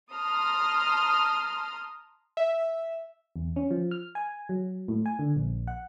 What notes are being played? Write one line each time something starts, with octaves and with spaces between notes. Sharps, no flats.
A5 A#5 C6 D#6 F6
E5
E2
C#4
F3
F6
G#5
F#3
A2
G#5
D3
A#1
F#5